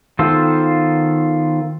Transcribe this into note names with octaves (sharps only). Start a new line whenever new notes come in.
D#3 B3 F4 A4 C5